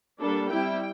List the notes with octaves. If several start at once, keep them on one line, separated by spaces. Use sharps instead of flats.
G3 A#3 D4 A4
G3 C4 E4 G5